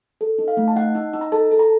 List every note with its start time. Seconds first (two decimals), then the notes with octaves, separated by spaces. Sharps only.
0.21 A4
0.38 D#4
0.48 F5
0.57 A3
0.68 A5
0.76 D#4 F#5
0.95 D#4
1.13 D#4
1.21 A#5
1.32 A4 A5
1.51 A4
1.59 A#5